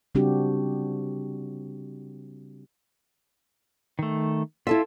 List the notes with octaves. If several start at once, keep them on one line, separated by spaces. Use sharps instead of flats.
C#3 G3 C4 D4 F#4 G4
D#3 A3
E4 F4 A4 E5